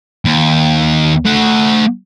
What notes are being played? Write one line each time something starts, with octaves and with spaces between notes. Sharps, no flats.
D#2
A3 F#5